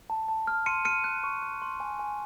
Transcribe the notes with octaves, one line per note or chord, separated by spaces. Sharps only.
A5
A5
F6
C6 C#7 D#7
F6 C#7 D#7
F#6
C#6
F#6
C6
G#5
G#5